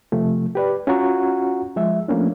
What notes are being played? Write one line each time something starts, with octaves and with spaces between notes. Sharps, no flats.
C3 F3 A3
G4 B4 D5
C#4 F4 F#4 F#5 A#5 C#6
F3 G#3 E5
F3 A3 A#3 C#4 D4